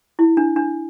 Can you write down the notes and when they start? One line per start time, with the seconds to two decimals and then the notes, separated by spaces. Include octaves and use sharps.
0.19 E4
0.37 D4
0.56 D4